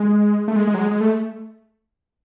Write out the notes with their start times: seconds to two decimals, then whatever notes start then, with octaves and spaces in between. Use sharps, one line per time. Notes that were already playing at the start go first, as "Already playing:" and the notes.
Already playing: G#3
0.48 A3
0.56 G#3
0.67 G#3
0.74 F#3
0.79 G#3
0.91 G#3
1.01 A3